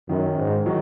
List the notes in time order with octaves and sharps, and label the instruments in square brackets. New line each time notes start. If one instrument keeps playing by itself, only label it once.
[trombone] F#2 [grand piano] D#3
[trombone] G#2
[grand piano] D#3 F#3